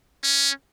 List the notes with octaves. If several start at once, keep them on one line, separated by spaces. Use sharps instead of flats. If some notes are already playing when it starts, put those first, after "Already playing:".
C#4